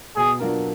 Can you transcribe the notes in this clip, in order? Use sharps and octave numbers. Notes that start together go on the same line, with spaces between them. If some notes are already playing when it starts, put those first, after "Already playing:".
B2 G#4
F#3 D4 F4 A#4